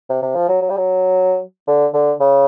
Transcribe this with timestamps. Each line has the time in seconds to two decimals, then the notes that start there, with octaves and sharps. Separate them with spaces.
0.09 C3
0.22 C3
0.35 F3
0.49 F#3
0.62 F#3
0.70 G3
0.77 F#3
1.67 D3
1.93 D3
2.20 C#3